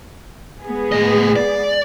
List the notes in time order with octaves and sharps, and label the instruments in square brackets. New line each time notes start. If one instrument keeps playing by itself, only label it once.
[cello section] G#3 B3 G#4
[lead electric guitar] A2 D#5
D5